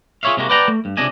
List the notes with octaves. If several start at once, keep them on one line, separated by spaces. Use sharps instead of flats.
F4 G#4 C5 C#5 E5 F5
C3 G#3 A#3 C#4 F#4
B4 D5 F#5 G5 A5 A#5
A3
G2
C#2 C3 D4 D#5 G#5